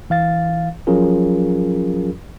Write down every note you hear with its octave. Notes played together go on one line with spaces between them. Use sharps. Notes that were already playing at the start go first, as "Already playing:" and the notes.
E3 F5 A6
F3 F#3 C#4 F4 G#4 A#4